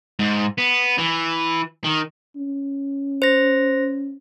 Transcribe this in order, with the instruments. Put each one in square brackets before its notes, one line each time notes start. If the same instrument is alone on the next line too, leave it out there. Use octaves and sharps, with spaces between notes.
[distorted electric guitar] G#2
B3
E3
D#3
[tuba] C#4
[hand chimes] C5 A#6